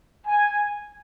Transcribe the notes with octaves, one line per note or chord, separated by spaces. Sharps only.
G#5